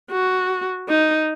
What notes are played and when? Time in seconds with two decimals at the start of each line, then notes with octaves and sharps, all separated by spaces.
0.11 F#4
0.89 D#4